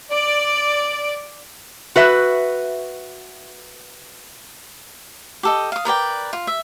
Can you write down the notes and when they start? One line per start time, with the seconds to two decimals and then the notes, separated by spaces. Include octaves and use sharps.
0.12 D5
1.96 F#4 B4 E5
5.43 G4 A4 D#5
5.72 F5 D#6
5.85 A#4 B4 D5 G5
6.33 F4
6.47 E5